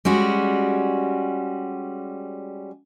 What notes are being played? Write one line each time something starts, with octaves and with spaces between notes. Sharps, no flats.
G3 G#3 C#4 F#4